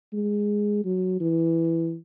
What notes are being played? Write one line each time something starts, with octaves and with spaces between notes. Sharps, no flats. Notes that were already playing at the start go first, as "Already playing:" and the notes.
G#3
F#3
E3